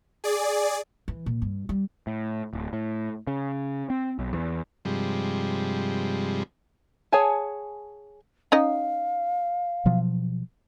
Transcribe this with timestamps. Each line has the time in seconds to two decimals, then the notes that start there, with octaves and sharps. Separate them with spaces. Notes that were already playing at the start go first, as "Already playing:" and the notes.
0.24 G#4 D5
1.08 E3
1.26 A#2
1.42 G2
1.69 G3
2.07 A2
2.53 D1
2.73 A2
3.27 C#3
3.90 C4
4.19 B1
4.33 E2
4.85 G2 C3 F3 G3 G#3
7.12 G#4 C#5 F#5 G#5 A5
8.52 C#4 D#4 D#5 F5
9.85 B2 F3 F#3